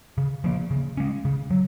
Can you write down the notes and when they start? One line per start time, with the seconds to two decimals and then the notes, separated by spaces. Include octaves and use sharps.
0.18 C#3
0.44 F3 A#3
0.71 C#3
0.97 G#3 C#4
1.25 C#3
1.51 F#3